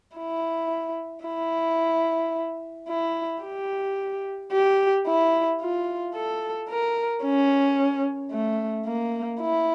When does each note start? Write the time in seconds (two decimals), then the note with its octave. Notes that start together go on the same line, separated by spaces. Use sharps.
0.16 E4
1.25 E4
2.89 E4
3.43 G4
4.52 G4
5.06 E4
5.61 F4
6.15 A4
6.69 A#4
7.23 C#4
8.31 A3
8.86 A#3
9.40 E4